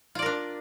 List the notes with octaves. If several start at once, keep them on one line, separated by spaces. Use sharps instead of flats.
D4 F4 A#4 D5